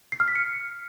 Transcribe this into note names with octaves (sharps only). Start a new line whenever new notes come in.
C7
F6
B6
C#7